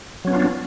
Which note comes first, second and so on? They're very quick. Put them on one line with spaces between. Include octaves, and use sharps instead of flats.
F#3 C#4 B3 F4 D4